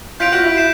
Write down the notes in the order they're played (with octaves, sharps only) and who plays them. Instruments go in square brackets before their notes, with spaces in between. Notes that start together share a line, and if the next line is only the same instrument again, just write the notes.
[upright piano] F4 [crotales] G6 B6 D7 F7
[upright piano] F#4
E4
[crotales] G6 C7 E7